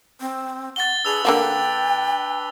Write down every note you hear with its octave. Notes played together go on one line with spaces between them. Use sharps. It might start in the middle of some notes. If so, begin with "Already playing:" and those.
C4
F#5 A6 G7
D4 G#4 B4 E6 F7
D3 A#3 F#4 G5